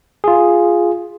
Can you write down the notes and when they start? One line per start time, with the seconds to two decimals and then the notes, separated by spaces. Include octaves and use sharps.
0.24 F4 G#4